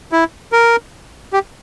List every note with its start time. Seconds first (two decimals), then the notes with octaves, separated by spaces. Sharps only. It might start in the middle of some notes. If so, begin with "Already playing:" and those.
0.12 E4
0.52 A#4
1.33 G4